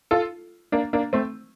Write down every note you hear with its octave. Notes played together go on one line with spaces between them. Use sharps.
F4 A4
A#3 D4
A#3 D4
A3 C4